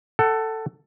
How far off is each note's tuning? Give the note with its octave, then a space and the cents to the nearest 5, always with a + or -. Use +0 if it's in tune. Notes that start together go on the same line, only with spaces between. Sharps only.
A4 +10 F#5 +25